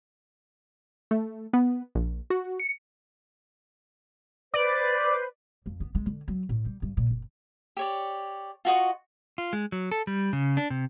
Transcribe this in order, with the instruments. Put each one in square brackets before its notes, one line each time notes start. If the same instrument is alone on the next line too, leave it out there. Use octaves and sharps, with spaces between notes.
[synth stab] A3
B3
A#1
F#4
C#7
[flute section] B4 C5 [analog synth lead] D5
[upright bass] F2
B3
G#3
D3
F#3
A2
G3
G2
A#2
F#1
[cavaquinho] G4 C#5 D5
F4 F#4 D#5 C#6
[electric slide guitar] F4
G#3
F#3
A4
G3
C#3
D4
C3